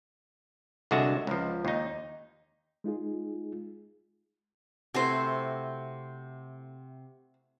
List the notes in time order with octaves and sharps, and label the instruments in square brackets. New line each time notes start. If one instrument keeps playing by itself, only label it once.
[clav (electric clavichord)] C2 D3 G#3 F#4 E5 A5
C#2 F3
D#2 D#4
[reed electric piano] G#3 D#4 F4 G#4
[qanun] C3 A3 E4 [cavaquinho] F#4 C5